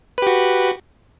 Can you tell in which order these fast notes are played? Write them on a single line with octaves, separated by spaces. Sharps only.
B4 G4 F#4